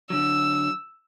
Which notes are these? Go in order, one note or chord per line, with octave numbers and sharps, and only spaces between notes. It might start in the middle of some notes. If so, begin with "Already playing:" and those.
D3 F#3 E6